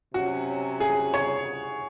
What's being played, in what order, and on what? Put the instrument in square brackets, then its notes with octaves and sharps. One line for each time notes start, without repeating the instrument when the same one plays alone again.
[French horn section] C3 F#3 C#4 [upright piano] F#4
[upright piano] G#4
C#5